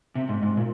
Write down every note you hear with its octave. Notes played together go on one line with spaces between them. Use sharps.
C3
G#2
G#2
A#2